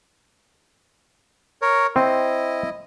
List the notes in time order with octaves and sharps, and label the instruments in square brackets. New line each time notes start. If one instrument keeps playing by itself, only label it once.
[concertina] A#4 C#5
[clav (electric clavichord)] C4 [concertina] E4 D#5